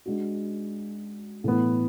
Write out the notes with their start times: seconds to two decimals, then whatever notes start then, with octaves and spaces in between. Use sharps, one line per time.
0.06 G#3 D4 F#4
1.44 A2 E3 B3